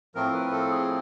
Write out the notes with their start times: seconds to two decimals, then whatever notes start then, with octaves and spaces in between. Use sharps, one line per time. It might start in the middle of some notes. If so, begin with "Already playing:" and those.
0.15 A2 F3 A3 C4 A#4
0.34 B4
0.52 A4
0.70 G#4